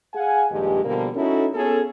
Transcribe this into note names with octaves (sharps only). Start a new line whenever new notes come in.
G#4 F5 F#5 G#5
A#1 G2 D#3 G#3 G4
B2 D3 F3 G3 A#3
C#4 D#4 E4 F#4 A4
B3 C#4 F4 G#4 A4